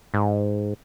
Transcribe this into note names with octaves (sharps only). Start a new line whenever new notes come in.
G#2